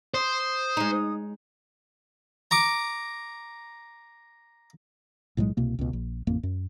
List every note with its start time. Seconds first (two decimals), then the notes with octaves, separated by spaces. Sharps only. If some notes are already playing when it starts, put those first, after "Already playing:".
0.14 C5 D#6
0.77 G#3 D#4
2.51 A#5 C#6 D6
5.37 B1 A2 F#3 G#3
5.57 C2 B2 A#3
5.79 C#2 B2
5.93 A#1
6.27 A1 F2 A#3
6.43 F#2